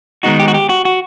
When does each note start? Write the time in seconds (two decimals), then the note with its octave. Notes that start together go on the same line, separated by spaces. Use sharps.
0.23 D#3 G#3 B3 D#4 F#4
0.40 G4
0.48 F#4
0.54 G4
0.69 F#4
0.85 F#4